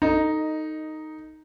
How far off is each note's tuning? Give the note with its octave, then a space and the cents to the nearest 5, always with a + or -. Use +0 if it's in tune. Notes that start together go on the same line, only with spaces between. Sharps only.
D#4 +0 A4 +20 D#5 -10